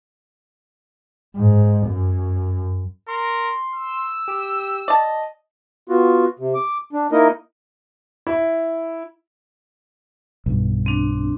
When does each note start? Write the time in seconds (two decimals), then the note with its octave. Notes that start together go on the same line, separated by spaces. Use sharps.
1.36 G#2
1.87 F#2
3.08 A#4 C6
3.75 E6
4.28 G4
4.88 D5 D#5 A5
5.89 B3 F4 F#4
6.39 C3
6.55 D6
6.93 D4
7.12 A#3 D#4 E4 A#4 D#5
8.27 E4
10.46 B1 G2
10.86 C4 D4